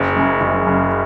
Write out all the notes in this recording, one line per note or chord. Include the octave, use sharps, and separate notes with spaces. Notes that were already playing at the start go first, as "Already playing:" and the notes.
Already playing: F#1
F#2 C#3
F#1
F#2 C#3